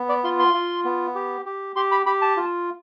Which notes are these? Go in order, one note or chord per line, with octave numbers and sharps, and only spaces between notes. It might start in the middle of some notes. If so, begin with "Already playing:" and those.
Already playing: B3
D5
F4 C6
C6
F4
B3
G4
G4
G4 C6
B5
G4 B5
A5
F4